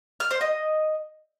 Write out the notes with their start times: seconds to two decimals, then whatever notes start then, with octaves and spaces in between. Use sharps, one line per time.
0.20 F6
0.31 C5
0.41 D#5